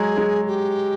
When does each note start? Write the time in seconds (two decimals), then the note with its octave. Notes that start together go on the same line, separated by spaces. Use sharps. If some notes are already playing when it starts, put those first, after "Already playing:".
Already playing: F#3 G#3 G#4
0.17 F#3 G#3
0.47 G4